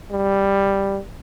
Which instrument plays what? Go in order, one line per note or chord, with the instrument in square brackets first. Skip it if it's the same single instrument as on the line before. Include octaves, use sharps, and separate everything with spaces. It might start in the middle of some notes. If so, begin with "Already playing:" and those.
[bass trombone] G3